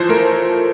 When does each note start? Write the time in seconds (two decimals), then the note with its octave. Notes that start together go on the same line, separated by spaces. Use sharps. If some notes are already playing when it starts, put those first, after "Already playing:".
Already playing: E3 F3 C5
0.09 A3 A#4